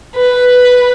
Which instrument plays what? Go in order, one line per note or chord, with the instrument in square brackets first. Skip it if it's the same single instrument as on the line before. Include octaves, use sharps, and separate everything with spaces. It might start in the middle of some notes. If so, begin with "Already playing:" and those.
[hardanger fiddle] B4